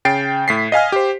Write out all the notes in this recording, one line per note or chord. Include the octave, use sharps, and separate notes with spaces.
C#3 G5 A6 C7 D7
A2 B6 C7
D#5 F5 G#5 F6
G4 C5